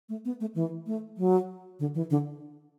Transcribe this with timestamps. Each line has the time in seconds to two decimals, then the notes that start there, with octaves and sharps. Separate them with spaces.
0.09 A3
0.25 B3
0.40 A3
0.55 E3
0.87 A3
1.17 F#3
1.79 D3
1.95 E3
2.10 D3